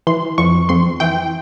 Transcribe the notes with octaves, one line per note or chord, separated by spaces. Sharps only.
E3 C6
F2 C#6
F2 C6
E3 G5